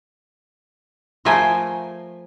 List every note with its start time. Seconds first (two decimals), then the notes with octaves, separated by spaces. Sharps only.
1.25 F3 A3 A#4 C5 G#5